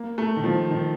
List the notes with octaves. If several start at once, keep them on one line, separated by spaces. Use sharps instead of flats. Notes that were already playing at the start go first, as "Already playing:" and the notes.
Already playing: A#3
A3
D#3
F3
D#3